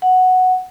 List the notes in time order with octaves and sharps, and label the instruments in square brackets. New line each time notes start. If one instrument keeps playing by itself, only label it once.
[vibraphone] F#5